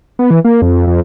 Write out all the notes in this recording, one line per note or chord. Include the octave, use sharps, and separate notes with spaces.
B3
E3
A#3
F2
F2